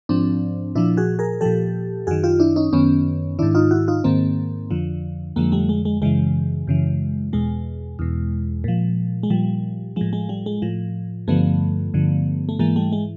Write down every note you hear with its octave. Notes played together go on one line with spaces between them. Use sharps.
G#2 F3 C4 D4
A#2 F3 D4 E4
F#4 G#4
G#4 A#4
A#2 F3 G4 A4
F#2 D#3 F#4 G#4
F4 G4
D4 E4
C#4 D#4
F#2 D#3 B3 C#4
G#2 D#3 D4 E4
D#4 F4
E4 F#4
D#4 F4
G#2 D#3 A#3 C4
F2 D3 F3
F2 D3 F3 G#3 A#3
G3 A3
G#3
G#3
F#2 C#3 E3 G#3
F#2 C#3 E3
E2 B2 G#3
E2 B2
A#2 F3
G#3
A#2 F3 G3
A2 F3 G#3
G#3
G3
G#3
A2 F3
G2 D3 F3 A3 B3
G2 D3 F3
A3
G#2 E3 G#3 A#3
G3 A3
G#3